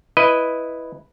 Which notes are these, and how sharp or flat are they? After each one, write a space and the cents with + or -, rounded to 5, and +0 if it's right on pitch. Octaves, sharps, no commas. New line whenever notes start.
E4 +0 B4 +0 D#5 +0